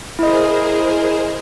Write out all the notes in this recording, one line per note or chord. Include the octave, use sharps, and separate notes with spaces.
E4 G#4 A#4 C5 D#5